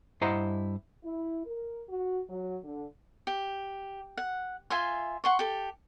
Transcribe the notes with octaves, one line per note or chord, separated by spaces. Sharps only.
G2 E4 C5 D#5 F#5 A#5
E4
A#4
F#4
F#3
D3
G4
F#5
F4 E5 G#5 C6
F#5 C6 C#6
G4 A4